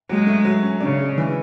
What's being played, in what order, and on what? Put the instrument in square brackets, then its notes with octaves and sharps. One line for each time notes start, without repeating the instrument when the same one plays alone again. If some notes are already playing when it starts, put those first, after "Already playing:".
[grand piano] F#3 [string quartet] G#3
[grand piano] A3
F#3
C#4
[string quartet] C#3 [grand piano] D4
[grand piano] G#3
E3